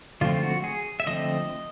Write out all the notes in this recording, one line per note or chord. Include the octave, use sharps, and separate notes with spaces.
D3 F3 A3 C4 F4
F#4
G#4
E5
D3 F3 A3 C4 D#5